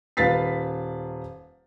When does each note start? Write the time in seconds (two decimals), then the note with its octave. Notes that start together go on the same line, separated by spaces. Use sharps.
0.17 D#1 B4 F5 A6 B6 C7